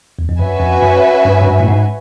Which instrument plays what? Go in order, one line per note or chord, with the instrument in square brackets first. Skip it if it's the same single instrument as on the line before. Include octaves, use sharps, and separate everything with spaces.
[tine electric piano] E2
F2
[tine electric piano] F#2 [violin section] C#4 F#4 B4 E5 G#5
[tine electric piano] F2
F#2
G2
G#2
G2
A2
G#2